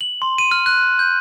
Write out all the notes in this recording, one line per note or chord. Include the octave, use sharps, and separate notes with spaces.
F#7
C6
D#7
F6
F#6
G6